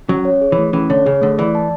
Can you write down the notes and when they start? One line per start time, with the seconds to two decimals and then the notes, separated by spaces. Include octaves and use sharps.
0.09 F#3 C#4
0.25 C#5
0.41 G#4
0.52 E3
0.58 A3
0.73 E3 C#4
0.90 D3 C#5
1.06 C#3 G#4
1.22 D3 A3
1.39 E3 D5
1.55 A5